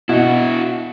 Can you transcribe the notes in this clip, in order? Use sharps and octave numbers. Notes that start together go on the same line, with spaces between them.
B2 E4 F#4